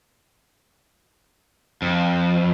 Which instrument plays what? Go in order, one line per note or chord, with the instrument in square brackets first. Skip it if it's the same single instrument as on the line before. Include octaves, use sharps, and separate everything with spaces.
[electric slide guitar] F2